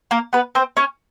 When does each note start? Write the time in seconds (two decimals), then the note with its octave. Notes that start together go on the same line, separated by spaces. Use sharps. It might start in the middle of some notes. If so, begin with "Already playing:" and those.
0.11 A#3 A#4
0.33 B3 B4
0.55 C4 C5
0.77 C#4 C#5